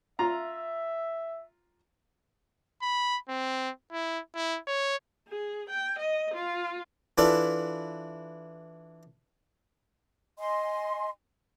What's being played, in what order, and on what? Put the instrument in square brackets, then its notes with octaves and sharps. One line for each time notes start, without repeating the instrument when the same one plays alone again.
[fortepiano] F4 A#5 [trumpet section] E5
[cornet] B5
C4
E4
E4
C#5
[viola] G#4
G5
D#5
F4
[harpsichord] E3 D4 E4 F4 A4 B4
[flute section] D#5 G#5 C6